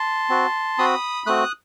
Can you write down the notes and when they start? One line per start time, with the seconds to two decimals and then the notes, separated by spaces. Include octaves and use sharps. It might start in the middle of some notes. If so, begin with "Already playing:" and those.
Already playing: A5 C6
0.29 C4 F#4
0.78 C4 F#4 B5 D#6
1.26 A3 C4 F#4 D#6 F#6